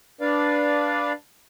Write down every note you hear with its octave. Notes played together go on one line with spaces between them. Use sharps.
D4 B4 D5 F5